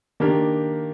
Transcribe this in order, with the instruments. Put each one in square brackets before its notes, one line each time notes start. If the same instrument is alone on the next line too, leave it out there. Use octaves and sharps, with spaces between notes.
[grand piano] D#3 A#3 D4 G4 A#4